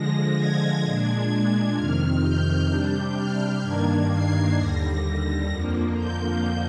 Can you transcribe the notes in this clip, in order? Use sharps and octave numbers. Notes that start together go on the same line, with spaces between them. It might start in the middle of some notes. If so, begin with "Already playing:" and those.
Already playing: D3 F3 G#3 A#6
G#6
A#2 G#3 D4
F2 C3 D#3 F6
G6
C3 G3 D4
F6
G2 D#3 A#3 D4 G#6
C7
D#2 D3 G3 A#6
F2 D3 F3 A#3
G6